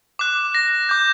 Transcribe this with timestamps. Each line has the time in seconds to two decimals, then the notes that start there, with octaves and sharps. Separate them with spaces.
0.19 D6 F#6
0.55 A#6
0.89 D6 G6